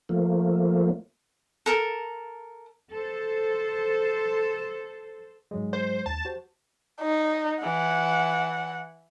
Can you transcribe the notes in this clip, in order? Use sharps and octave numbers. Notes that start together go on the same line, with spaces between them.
F3 A3 A#3
A4 A#4
A4 C5
G#2 F#3 G#3
C5
D#2 A5
F#4 G4 C5
D#4
E3 F#5